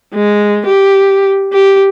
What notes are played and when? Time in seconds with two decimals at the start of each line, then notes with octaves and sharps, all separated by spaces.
0.14 G#3
0.66 G4
1.53 G4